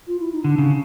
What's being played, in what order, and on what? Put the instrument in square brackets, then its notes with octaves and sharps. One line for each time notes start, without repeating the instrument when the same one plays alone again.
[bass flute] F4
E4
D#4
[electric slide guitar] D3 [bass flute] D4
[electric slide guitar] C#3